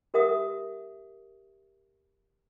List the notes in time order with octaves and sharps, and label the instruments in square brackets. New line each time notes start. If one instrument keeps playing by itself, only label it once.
[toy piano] G4 A#4 E5 F#5 D#6